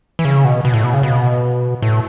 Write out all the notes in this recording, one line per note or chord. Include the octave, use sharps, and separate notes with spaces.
E3
C#3
B2
B2
A2
B2
C#3
B2
A2